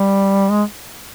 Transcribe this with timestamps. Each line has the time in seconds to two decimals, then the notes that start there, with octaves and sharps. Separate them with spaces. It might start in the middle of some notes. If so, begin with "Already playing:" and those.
Already playing: G3
0.50 G#3